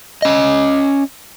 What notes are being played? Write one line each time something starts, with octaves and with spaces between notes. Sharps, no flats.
C#4 D#5